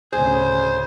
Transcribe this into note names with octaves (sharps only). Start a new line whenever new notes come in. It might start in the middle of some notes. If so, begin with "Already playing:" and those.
D2 A2 C#3 G#4 C5